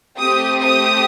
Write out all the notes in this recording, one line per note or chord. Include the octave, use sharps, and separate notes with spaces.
A3 C4 G4 D#6
D#6